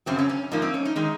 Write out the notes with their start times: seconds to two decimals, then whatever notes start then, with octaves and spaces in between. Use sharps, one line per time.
0.06 F#2 C#3 F#3 C4
0.19 C#4
0.29 C#4
0.51 G#2 F3 A#3 D#4
0.62 C4
0.74 C#4
0.85 D#4
0.96 D#3 G#3 D#4